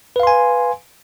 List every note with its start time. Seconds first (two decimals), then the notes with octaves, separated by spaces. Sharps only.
0.16 B4
0.20 F5
0.23 C6
0.27 G#5